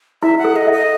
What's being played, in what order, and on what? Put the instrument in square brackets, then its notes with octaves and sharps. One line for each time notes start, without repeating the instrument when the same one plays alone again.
[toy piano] E4 [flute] E5
[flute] F#5
[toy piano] A4
[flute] D#5
[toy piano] E5
[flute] D#5